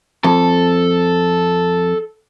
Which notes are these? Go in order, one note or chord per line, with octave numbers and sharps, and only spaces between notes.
F2 A4